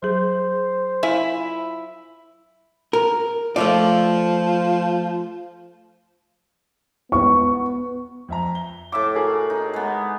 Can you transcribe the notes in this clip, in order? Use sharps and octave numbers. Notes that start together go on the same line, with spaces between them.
F#3 G#4 C5
E4 F4 E5 G#5
A#4
F3 A3 F4 D5
B3 C#6
F2 E5 A#5
G7
A2 E5 D6
F#4 G#4 A#4
D#4
G#3 B3